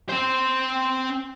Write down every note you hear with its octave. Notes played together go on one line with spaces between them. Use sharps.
C4 C5